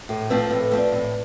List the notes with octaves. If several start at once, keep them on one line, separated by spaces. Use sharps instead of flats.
A2 A4
F3 A3 C4 B4
A2 B4
A4
B4
F3 A3 C4
B4 D5
A2